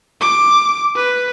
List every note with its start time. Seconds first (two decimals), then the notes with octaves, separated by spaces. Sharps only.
0.21 D6
0.96 B4